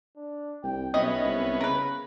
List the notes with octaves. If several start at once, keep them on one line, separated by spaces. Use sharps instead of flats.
D4
C2 G5
B1 B3 C#4 D#5 E5
C2
C#3 A#4 B4